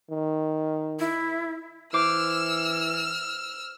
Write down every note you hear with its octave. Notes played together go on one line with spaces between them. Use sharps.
D#3
E4
E3 C5 D6 E6 F6